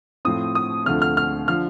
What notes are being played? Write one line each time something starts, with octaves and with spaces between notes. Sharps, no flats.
A2 F3 C4 D#6
D#6
D2 D3 F3 A3 C4 F6
F6
F6
D3 F3 F6